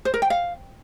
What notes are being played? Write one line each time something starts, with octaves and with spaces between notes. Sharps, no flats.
C5
A#4
G5
F5